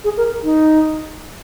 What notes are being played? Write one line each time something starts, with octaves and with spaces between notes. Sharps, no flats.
G#4
A#4
D#4